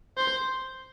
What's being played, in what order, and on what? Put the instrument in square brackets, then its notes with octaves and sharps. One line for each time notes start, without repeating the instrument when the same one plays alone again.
[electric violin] C5